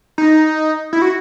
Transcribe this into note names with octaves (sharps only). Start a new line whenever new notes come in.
D#4
E4
F#4